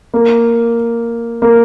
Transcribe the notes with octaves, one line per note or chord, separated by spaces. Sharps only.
A#3
A#3